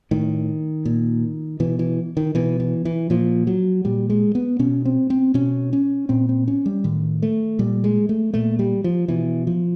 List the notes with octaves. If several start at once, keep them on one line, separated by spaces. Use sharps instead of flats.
A2 D#3
A#2
B2 E3
E3
D#3
B2 E3
E3
E3
A#2 F3
F#3
A#2 G3
G#3
B3
B2 C#4
C4
C4
B2 C#4
C#4
A#2 C4
C4
C#4
G3
A2 D#3
A3
A#2 G3
G#3
A3
A#2 A3
G3
F3
B2 E3
F3